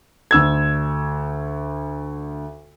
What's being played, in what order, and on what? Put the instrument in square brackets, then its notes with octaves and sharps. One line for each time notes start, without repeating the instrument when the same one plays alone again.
[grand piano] D2 E6 G#6